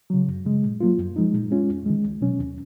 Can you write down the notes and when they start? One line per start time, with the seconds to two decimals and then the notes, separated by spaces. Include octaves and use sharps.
0.10 C#3 F#3
0.28 F#2
0.45 C#3 G#3
0.64 A#2
0.81 F#3 A#3 F4
0.98 F#2
1.16 F3 G#3 D#4
1.33 A#2
1.50 G#3 C#4 F4
1.69 F2
1.86 D#3 G#3
2.03 C#2
2.21 B2 F#3 C#4
2.39 D#2